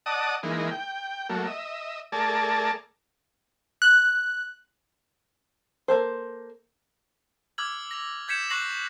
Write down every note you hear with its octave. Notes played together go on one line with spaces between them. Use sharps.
D5 D#5 F#5 A5 D#6
E3 G#3 A#3 D#4
G5
F#3 A3 A#3
D#5 E5
A3 G#4 A#4 D5 A5
F#6
A#3 A4 C5
D6 E6 F6 G#6 F#7
A#6 F7
G6 G#6 B6 C#7 E7
C#6 F#6 A#6 C7 F#7